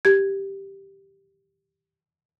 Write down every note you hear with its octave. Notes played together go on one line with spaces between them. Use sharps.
G4 G#6